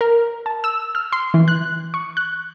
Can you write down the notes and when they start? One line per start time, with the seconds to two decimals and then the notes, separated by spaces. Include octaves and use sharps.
0.01 A#4
0.46 A5
0.64 E6
0.95 F6
1.12 C6
1.34 E3
1.48 F#6
1.94 C#6
2.17 F#6